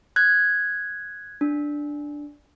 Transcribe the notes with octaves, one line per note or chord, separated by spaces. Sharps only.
F#6 G#6
D4